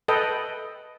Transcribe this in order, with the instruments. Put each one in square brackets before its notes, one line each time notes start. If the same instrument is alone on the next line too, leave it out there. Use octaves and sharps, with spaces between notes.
[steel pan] A4 B4 D#5 G5